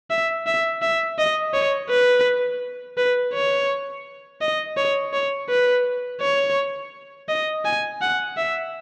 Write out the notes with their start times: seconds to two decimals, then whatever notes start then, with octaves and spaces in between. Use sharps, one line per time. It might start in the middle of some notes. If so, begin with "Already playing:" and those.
0.10 E5
0.46 E5
0.82 E5
1.18 D#5
1.54 C#5
1.90 B4
2.97 B4
3.33 C#5
4.41 D#5
4.77 C#5
5.13 C#5
5.49 B4
6.21 C#5
7.29 D#5
7.65 G#5
8.01 F#5
8.37 E5